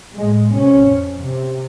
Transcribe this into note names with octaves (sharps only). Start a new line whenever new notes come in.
A2 G#3
C3 C#4
F2
C3